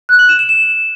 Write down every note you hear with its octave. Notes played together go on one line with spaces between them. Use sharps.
F#6
F#7
E7
E7
E7